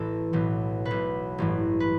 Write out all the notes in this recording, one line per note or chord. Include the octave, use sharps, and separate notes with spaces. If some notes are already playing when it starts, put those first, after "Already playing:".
Already playing: A1 A2 E3 A4
B1 A2 E3
B2 B4
B1
A1 G2 E3
B4